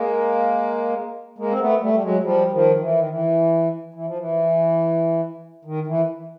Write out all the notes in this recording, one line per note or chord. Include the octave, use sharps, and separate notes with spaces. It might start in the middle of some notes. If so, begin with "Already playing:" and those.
Already playing: G#3 A#3
G#3 A#3
C4
A3 B3
G3 A3
G3
F#3 G#3
F3 G3
D#3 F3
E3
D#3
E3
E3
F3
E3
D#3
E3